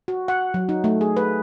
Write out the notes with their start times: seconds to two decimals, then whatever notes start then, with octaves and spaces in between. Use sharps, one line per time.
0.08 F#4
0.28 F#5
0.54 F#3
0.69 D#4
0.84 A3
1.01 G#4
1.17 B4